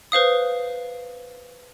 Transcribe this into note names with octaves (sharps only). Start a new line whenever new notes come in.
B4 C5 F5 D#6